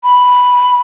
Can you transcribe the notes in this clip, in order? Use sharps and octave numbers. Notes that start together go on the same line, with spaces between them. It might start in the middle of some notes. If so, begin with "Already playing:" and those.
B5